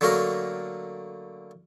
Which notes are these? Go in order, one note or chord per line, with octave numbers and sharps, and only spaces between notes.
D3 F#3 A3 A#3 A#4